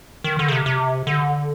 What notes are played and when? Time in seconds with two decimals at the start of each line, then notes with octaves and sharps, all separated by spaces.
0.24 D#3
0.39 D3
0.48 C#3
0.52 C3
0.66 C3
1.07 D3